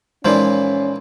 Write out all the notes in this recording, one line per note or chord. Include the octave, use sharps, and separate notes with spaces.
A#2 E3 F3 G#3 C#4 D#4 D5